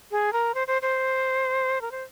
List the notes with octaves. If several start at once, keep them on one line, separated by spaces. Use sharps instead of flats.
G#4
A#4
C5
C5
C5
A#4
C5